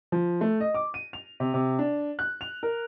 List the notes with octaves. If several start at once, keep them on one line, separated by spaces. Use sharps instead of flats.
F3
A3
D#5
D6
D#7
F7
C3
C3
D4
F#6
F7
A#4